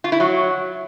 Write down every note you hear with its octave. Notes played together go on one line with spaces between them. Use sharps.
F4
E4
F#3